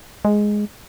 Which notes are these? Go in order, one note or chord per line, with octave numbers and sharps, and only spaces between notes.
G#3